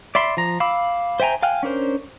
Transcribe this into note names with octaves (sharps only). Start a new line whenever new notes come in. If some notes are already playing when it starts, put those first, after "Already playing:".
D5 E5 B5 C6
F3 A#5
F5 B5 D6 E6
C5 E5 G5 G#5 A#5
F5 G5 G#5 F6 F#6
C#4 D4 A#4 C5